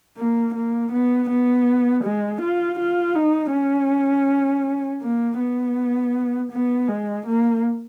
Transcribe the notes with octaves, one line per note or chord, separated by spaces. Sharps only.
A#3
A#3
B3
B3
G#3
F4
F4
D#4
C#4
A#3
B3
B3
G#3
A#3